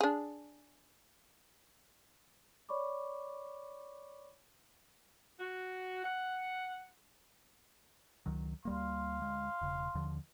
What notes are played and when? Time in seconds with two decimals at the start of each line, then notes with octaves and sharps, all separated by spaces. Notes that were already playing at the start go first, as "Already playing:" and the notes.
0.01 D4 G#4
2.69 C#5 D5 B5 C#6 D6
5.39 F#4
6.05 F#5
8.26 C#2 D#3 F#3
8.65 D2 G3 A#3 F5 C6
9.21 D2 G#3
9.61 E1 C#3
9.95 D#2 D3 F3